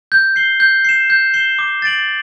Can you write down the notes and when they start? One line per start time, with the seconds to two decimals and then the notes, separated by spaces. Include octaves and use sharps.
0.12 G6
0.36 C7 G7
0.60 G6
0.85 C7 E7
1.10 G6
1.34 C7 E7 G7
1.59 D6
1.82 A6 D7 F#7